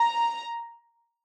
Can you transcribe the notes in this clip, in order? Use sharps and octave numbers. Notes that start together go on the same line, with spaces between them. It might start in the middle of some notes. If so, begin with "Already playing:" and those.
Already playing: A#5